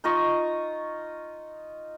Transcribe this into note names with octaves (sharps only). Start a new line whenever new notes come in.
D#4 F4 D#5 C#6